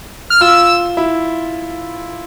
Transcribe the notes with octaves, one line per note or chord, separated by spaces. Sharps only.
F6
F4 E6
E4